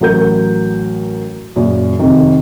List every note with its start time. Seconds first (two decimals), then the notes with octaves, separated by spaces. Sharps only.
0.01 A1 F#3 A#4 G6
1.56 F#2 A#2 C#3
1.99 F2 C3 D#3